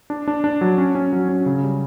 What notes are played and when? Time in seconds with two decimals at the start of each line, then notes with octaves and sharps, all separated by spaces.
0.10 D4
0.28 D4
0.44 D4
0.61 F#3
0.78 C#4
0.95 C#4
1.13 F#3
1.29 C#4
1.46 C#3
1.63 G3